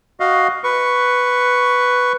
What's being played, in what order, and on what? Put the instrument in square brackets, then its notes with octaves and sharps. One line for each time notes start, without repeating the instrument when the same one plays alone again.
[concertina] F#4 D#5 F5
B4 C#6